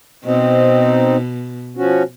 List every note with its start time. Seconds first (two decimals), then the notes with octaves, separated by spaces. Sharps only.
0.24 B2 C4 D#4
1.77 F3 C#4 F#4